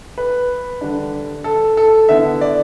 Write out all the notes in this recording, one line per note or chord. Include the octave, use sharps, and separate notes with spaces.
B4
D3 G3 D4
A4
A4
D3 B3 E4 E5
D5